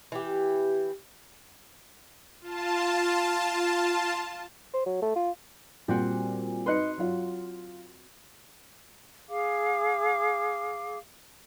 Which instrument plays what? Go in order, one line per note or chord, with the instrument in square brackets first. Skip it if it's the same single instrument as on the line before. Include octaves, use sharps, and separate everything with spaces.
[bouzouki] E3 G4
[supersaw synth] F4 A5
[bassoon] C5
F#3
A3
F4
[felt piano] A#2 [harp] G3 C4 F#4
[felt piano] D#4 B4 [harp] C6 F#6 C#7
[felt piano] F#3 F4
[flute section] G#4 F5 D6